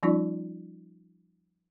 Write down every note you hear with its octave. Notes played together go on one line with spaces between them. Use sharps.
F3 G3 C#4 D#4 F4 D5